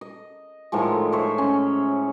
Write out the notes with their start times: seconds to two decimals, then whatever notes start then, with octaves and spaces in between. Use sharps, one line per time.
0.01 D#5
0.72 A2 D#3 F3 G#3
1.12 C5 C#5 E5
1.38 C#4